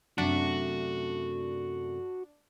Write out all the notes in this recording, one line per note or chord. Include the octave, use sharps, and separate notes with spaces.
F#2 C3 A3 D4 F#4